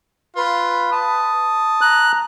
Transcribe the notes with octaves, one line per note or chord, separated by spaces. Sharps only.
F4 B4
A5 D#6
A#5 F#6